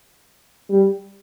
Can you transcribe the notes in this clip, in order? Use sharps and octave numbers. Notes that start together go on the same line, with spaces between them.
G3